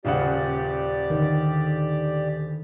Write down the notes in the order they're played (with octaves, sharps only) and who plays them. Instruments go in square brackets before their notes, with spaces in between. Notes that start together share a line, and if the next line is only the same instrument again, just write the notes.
[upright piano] D#1 C#3 F#5 [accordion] G4 D5
[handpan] D3 D#3